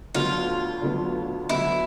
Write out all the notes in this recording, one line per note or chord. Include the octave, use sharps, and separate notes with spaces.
D2 D3 F#3 B3 F4
D2 D3 F#3 B3
D2 D3 F#3 B3 E4